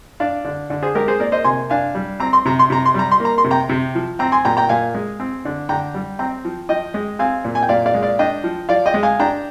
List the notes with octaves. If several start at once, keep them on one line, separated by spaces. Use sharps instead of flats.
D4 D5 F5
D3
D3
G#4 C5
G#3 G4 A#4
G#4 C5
A#3 A#4 D5
C5 D#5
C3 G#5 C6
D4 F5 G#5
G3
C4 A#5
C6
C3 A#5
C6
C3 A#5
C6
G3 A#5
C6
A#3
A#5
C6
C3
G5 A#5
C3
F3
C4 G5 A#5
G#5 C6
A#2 G5 A#5
G5 A#5
A#2 F5 G#5
G#3
C4
D3
D3 G5 A#5
G3
C4 G5 A#5
F3
F3 D#5 G5
G#3
C4 F5 G#5
A#2
G#5
G5
A#2 D5 F5
D5 F5
G#3
D5 F5
D4 D#5 G5
F3
F3 D5 F5
D#5 G5
G#3
F5 G#5
D4 G5 A#5